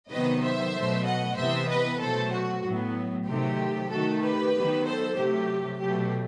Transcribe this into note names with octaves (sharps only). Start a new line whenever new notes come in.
C3 D#3 F#3 B3 B4 D#5
C5 E5
B2 F#3 A3
D#5 F#5
C3 E3 B3 C5 E5
B4 D#5
B2 F#3 A3 A4 C5
F#4
A2 F#3 B3
C3 D#3 F#3 A3 G4
D#3 A3 F#4 A4
G4 B4
D#3 F#3 B3
A4 C5
C3 F#3 A3 G4
B2 F#3 A3 G4